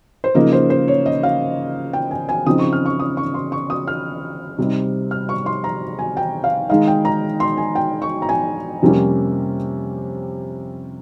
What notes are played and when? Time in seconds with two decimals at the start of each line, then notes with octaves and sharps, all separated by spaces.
0.24 C5
0.35 C#3 F3 A#3 D#4 A#4
0.53 C5
0.70 C5
0.88 C#5
1.06 D#5
1.23 F5
1.93 G5
2.11 G#5
2.29 G#5
2.46 C#3 F3 C4 D#4 D#6
2.59 C#6
2.72 F6
2.86 C#6
3.00 D#6
3.17 C#6
3.34 C6
3.52 C#6
3.70 D#6
3.88 F6
4.58 C3 G3 C4 D#4
5.11 F6
5.29 C#6
5.46 C6
5.64 A#5
5.99 G#5
6.17 G5
6.44 F5
6.69 D#3 G#3 D#4 F5
6.88 G5
7.05 A#5
7.40 C6
7.57 G#5
7.75 G5
8.02 C#6
8.22 A#5
8.29 G#5
8.82 F2 C3 G3 A#3 C#4